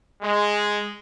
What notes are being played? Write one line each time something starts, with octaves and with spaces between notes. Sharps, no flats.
G#3